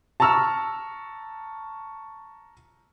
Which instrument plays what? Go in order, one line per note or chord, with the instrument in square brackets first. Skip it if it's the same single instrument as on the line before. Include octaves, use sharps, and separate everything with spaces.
[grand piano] A5 A#5 C#6 E6 F6